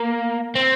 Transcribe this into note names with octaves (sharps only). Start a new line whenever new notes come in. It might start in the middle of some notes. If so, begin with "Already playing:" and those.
Already playing: A#3
C4